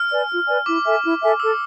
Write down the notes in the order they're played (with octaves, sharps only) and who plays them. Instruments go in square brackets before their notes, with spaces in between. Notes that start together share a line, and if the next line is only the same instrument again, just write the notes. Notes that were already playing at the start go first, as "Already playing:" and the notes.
Already playing: [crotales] F6
[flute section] B4 D5 G#5
F4
B4 D5 G#5
[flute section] E4 [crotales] D6
[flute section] A4 E5 G#5
E4
A4 E5 G#5
[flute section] A4 [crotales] E6